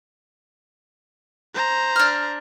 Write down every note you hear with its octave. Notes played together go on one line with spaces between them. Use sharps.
C5 A#5
D4 F6